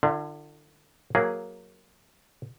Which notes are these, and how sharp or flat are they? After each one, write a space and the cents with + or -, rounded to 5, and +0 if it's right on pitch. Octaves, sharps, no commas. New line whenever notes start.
D3 +30 F4 -30
F#3 +0 A#3 +0 G#4 +0